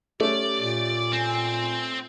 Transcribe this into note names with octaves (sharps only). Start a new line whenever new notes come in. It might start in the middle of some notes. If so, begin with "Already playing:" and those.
A3 C#4 G4 D5
A#2
C4 G#5